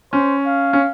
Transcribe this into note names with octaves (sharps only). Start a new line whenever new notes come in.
C#4 C5
F5
C#4